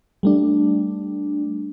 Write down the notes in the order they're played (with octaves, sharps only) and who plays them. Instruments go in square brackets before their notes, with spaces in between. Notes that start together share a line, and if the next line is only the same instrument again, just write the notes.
[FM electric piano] G3 A3 D4